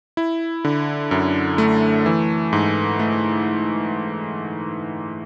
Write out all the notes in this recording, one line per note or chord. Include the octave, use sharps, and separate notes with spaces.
E4
D3
F#2
A3
E3
G#2
A3